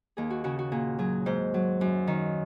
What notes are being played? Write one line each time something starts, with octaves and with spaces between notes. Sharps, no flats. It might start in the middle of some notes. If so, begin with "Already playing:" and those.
D#2 G#4
F#4
C#3 F#4
F#4
A#2 G#4
F#3 G#4
G#2 C5
F#3
F#2
D#3